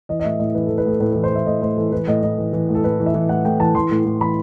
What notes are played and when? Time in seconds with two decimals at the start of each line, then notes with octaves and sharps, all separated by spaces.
0.09 E3 D#5
0.20 D#5
0.24 A2 E5
0.39 A2 D#5
0.55 E3 B4
0.66 E3 A4
0.78 B4
0.86 A2 A4
1.00 A2 B4
1.13 E3 B4
1.24 C5
1.31 E3 E5
1.46 A2 D#5
1.62 A2 C5
1.76 E3 A4
1.92 E3 B4
2.07 A2 D#5
2.23 A2 D#5
2.38 E3
2.53 E3
2.69 A2
2.75 A4
2.84 A2 B4
3.00 E3
3.06 E5
3.14 E3
3.29 A2 F#5
3.45 A2 G5
3.60 E3 A5
3.75 E3 C6
3.91 A2
4.05 A2
4.21 E3 B5